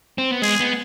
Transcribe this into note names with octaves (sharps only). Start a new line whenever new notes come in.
C4
B3
G#3 G#4
B3